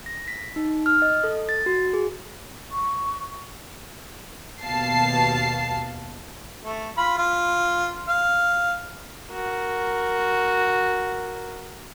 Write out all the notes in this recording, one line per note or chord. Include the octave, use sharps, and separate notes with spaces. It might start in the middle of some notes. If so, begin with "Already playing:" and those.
A#6
B6
D#4
F6
D#5
A4
A6
F#4
G#4
C#6
D#2 B2 F5 A5 C7
A3
F4 B5
F4
F5
F#4 A#4